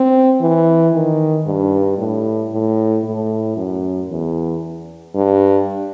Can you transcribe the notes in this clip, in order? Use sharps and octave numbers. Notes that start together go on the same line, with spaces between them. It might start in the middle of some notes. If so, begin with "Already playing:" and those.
Already playing: C4
E3
D#3
G2
A2
A2
A2
F#2
E2
G2